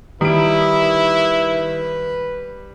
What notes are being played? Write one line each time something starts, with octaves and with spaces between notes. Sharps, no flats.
D#3 G3 E4 B4 D7